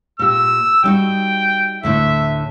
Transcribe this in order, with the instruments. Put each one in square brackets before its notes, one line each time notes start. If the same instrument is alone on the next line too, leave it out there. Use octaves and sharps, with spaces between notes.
[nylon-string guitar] A#2 G4 [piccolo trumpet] E6
[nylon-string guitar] G3 D#4 F#4 [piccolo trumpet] G5
[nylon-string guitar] D2 A2 D3 [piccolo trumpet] E5